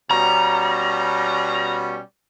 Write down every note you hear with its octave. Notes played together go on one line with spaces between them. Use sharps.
B2 G3 C#4 A#5